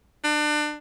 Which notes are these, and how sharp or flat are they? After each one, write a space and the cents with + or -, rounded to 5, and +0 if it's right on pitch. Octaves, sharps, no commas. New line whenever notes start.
D4 +30